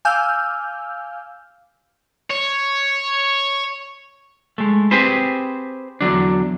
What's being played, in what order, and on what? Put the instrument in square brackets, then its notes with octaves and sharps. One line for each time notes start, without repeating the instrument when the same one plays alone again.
[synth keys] F5 G#5 D6 E6 F6 G6
[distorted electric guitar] C#5
[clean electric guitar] G#3 A3
C4 G4 G#4 B4 C5
E2 D3 F#3 D4